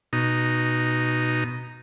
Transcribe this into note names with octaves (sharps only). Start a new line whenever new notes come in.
B2 D#4